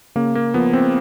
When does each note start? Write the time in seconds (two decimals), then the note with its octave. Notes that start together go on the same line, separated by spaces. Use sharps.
0.15 C#3 A#3
0.35 A#3
0.54 F3 B3
0.73 C4